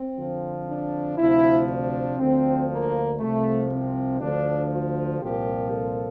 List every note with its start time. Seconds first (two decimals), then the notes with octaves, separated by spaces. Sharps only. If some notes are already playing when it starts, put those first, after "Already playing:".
Already playing: C4
0.17 F2 D3 F3
0.67 D4
1.17 D2 C3 F3 E4
1.68 D4
2.18 D2 D3 F3 C4
2.69 A#3
3.19 C2 C3 F3 A3
3.69 C4
4.20 D2 D3 F3 D4
4.71 F4
5.20 C2 A#2 F3 G4
5.71 A4